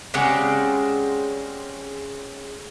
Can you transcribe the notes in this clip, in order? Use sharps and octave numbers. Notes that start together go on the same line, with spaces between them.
C#3 G#3 C4 G4 G#4 D5 F#5